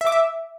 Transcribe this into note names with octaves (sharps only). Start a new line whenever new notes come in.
E5
D6
E5